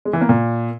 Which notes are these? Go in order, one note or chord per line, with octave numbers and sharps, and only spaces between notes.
G#3
E3
A#3
A#2